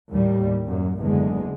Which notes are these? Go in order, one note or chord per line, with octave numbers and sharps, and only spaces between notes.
D#2 A2 G3
F#2
F#1 E2 D3 G#3